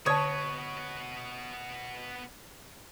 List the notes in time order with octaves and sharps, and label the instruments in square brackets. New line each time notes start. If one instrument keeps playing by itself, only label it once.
[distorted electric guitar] B2 B3 [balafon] D3 A5 [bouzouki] C#5 [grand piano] D#6 G#6